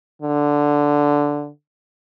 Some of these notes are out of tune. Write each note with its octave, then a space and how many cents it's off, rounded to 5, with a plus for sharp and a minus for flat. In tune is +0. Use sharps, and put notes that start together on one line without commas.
D3 -5